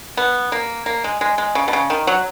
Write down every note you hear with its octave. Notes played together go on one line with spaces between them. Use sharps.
B3
A#3
A#3
G#3
G#3
G#3
C#3
B2
C#3
D#3
F#3